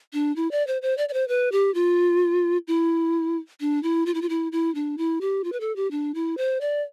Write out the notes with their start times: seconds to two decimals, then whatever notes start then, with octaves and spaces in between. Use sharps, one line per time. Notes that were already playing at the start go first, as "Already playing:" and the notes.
0.13 D4
0.36 E4
0.51 D5
0.67 C5
0.82 C5
0.98 D5
1.09 D5
1.13 C5
1.28 B4
1.52 G4
1.74 F4
2.68 E4
3.60 D4
3.83 E4
4.06 F4
4.14 E4
4.22 F4
4.29 E4
4.52 E4
4.75 D4
4.98 E4
5.21 G4
5.44 F4
5.52 B4
5.60 A4
5.76 G4
5.91 D4
6.15 E4
6.37 C5
6.61 D5